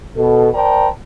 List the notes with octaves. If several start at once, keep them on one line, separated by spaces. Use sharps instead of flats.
B2 A4
A#4 C5 D5 G5 A5 A#5